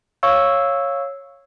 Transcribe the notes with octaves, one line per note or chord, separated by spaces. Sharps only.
C#5 F5 C#6 E6